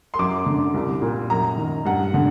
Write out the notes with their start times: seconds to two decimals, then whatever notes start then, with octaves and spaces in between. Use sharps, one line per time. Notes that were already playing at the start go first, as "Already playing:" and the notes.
0.14 C6
0.19 F#2 D6
0.46 D3
0.74 C2
1.02 A#2
1.30 F#2 A#5
1.57 D#3
1.85 G2 F#5
2.14 D3